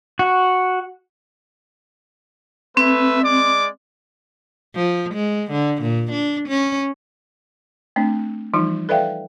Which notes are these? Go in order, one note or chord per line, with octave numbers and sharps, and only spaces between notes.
F#4
A3 C4 B4 E5
G#3 D5 D6
F3
G#3
D3
A#2
D4
C#4
A3 C4 D4
E3 F3 G3 D#4 F4
A4 B4 D5 E5 F5 G5